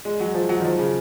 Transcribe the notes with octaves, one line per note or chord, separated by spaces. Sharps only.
G#3
F#3
F3
F#3
D#3
F3
C#3